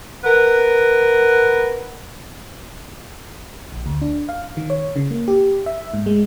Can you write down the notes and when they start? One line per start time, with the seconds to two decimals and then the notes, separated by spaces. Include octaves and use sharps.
0.24 A#4 B4 F#5
3.72 A#1
3.86 D2
4.02 D4
4.29 F5
4.57 D#3
4.70 C#5
4.96 C#3
5.11 A#3
5.28 G4
5.66 E5
5.94 G#2
6.06 G#3